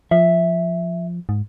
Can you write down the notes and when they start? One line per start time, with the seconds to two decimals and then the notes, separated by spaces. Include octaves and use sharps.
0.11 F3 E5
1.29 G#2